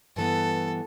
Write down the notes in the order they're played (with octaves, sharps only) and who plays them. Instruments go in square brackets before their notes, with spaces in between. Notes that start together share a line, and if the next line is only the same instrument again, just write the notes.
[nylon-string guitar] G2 E3 B3 [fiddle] A4